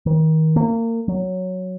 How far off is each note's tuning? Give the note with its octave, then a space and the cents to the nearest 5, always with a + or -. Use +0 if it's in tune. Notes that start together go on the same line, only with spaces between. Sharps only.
D#3 +30
A#3 -30
F#3 +0